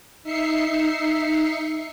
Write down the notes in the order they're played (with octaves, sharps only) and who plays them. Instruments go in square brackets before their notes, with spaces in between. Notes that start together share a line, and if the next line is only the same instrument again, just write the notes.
[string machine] D#4 E5 C7 C#7